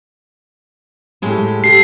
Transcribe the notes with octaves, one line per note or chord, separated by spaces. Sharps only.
A2 G#3 G4
G4 A4 C7